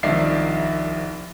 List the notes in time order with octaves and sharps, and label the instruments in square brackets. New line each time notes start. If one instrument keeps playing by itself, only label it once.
[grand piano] C2 D#3 F3 D4 E5 C7